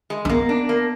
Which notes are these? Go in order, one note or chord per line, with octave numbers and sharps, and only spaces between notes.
G#3
D4
A#3 B3
D4
A#3